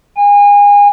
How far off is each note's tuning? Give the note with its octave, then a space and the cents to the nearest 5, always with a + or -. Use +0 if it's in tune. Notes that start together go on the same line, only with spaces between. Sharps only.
G#5 -30